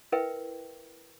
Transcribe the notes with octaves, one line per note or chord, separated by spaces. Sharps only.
E4 A#4 B4 E5 G5